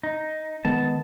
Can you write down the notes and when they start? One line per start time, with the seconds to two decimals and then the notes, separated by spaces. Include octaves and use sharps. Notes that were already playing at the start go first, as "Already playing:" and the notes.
0.03 D#4
0.65 D#3 G#3 B3 A5